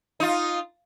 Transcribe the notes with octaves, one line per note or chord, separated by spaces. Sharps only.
D#4 F4